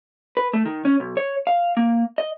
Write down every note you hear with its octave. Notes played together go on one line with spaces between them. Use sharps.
B4
A3
D#3
C#4
B1
C#5
F5
A#3
D#5